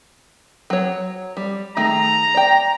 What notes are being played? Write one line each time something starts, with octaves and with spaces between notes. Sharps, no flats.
F#3 C#5
G3
D#3 A3 G#4 A#5
D5 G5